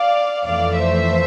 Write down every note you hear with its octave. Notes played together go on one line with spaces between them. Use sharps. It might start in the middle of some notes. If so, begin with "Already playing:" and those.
Already playing: D5 F5
F2 E3 A3 D5 F5
C5 E5